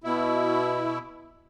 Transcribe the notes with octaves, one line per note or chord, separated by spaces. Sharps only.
B2 E4